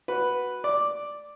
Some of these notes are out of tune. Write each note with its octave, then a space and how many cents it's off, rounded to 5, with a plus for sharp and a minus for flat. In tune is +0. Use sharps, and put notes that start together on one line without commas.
F#4 +0 B4 +0
D5 +0 D6 +0